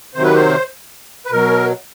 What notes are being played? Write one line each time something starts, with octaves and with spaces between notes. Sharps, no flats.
C3 D#3 F#3 C5
B4
C5
B4
B2 F#3 A#4